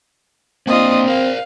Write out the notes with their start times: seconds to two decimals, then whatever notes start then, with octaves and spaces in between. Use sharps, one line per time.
0.67 A#3 C4 D4 F4 D#5
1.07 A#4 C5 F5